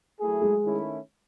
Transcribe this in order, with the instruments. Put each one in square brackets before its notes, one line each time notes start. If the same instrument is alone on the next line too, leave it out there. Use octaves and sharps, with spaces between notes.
[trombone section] F#3 A3 E4 G#4
[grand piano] G#3
[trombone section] D#3 A3 C#4 E4